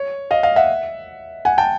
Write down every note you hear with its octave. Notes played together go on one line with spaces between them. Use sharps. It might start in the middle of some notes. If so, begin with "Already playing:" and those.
Already playing: C#5
D#5 F5
D#5 F5
E5 F#5
F#5 G#5
G5 A5